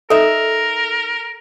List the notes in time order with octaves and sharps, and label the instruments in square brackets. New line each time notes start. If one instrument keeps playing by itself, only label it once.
[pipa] D#4 E5 [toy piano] A4 [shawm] A#4